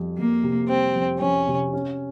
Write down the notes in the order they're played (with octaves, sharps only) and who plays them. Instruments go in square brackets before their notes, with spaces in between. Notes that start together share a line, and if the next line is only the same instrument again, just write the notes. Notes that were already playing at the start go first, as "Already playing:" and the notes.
Already playing: [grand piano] F2 G3
[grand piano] F2 [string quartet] A#3
[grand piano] C3
[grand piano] G3 [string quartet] C4
[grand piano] F2
[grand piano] F2 [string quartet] C#4
[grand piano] C3
C#4